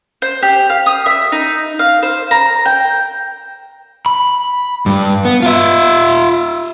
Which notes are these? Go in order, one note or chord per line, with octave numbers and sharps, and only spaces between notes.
C5
G4
F5
D#6
E5
D#4
F5
C5
A#5
G5
B5
G2
B3
F4 E5